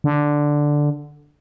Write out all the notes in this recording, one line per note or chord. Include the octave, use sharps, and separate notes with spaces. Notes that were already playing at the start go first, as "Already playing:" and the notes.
D3